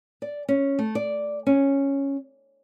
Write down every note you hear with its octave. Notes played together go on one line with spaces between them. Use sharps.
D5
C#4
A3
D5
C#4